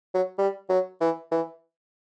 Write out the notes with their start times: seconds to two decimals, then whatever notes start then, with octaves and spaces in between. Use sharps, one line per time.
0.14 F#3
0.38 G3
0.69 F#3
1.01 E3
1.32 E3